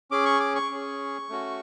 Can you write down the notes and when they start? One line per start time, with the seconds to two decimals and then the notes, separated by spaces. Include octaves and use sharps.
0.11 C#4 G#4 D6
0.26 C#6
0.40 D6
0.56 C#6
0.71 C#4 G#4
1.30 A3 C#4 F#4